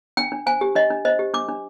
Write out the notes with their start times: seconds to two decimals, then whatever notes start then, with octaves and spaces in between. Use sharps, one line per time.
0.17 D4 G5
0.32 D4
0.46 C5 G#5
0.61 G4
0.76 D4 D#5
0.90 D4
1.05 C5 D#5
1.19 G4
1.34 D4 D6
1.49 D4